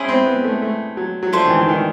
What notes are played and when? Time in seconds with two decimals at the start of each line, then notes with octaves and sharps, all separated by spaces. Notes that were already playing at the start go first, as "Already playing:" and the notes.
Already playing: C#4 E4 G#4 C5
0.09 C4
0.26 B3
0.44 A3
0.62 A3
0.97 F#3
1.23 F#3
1.32 F3 A3 D4 G4 C5
1.45 D#3
1.50 E3
1.61 E3
1.68 D#3